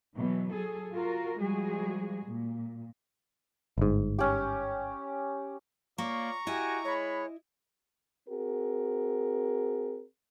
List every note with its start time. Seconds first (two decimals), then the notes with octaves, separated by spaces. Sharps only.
0.16 B2 E3 F#3
0.52 F#3 G#4 A4
0.93 F4 F#4 A#4
1.38 F3 G3 G#3 F#4 G#4
2.25 A#2
3.78 G1 G#2
4.19 C#4 G4
5.98 A#3 F4 C#5 D5 A#5 C#6
6.47 E4 F#4 G4 D#5 G#5
6.85 G#3 C#5 B5
8.29 C4 F#4 G#4 A#4